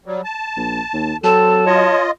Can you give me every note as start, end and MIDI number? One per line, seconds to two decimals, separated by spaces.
0.06 0.21 54
0.06 0.21 55
0.24 1.17 81
0.56 0.80 34
0.93 1.13 39
1.24 1.91 54
1.24 1.60 60
1.24 1.65 69
1.24 2.02 81
1.66 2.11 65
1.66 2.05 73
1.66 2.11 75